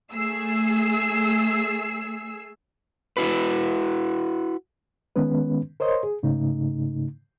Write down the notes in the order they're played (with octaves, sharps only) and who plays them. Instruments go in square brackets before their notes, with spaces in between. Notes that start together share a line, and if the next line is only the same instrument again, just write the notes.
[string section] A3 G#4 E6 C7
[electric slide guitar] E4 F#4 B4
[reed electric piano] D#3 G#3 B3 C#4 B4
A#4 C5 C#5 D#5 C6
G#4
G#2 C#3 A3 D#4